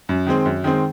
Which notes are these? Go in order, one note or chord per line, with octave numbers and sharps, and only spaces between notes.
F#2
D#3 G#3 C4
F#2
D#3 G#3 C4